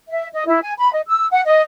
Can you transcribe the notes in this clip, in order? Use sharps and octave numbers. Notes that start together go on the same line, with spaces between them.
E5
D#5
E4
G#5
B5
D#5
E6
F#5
D#5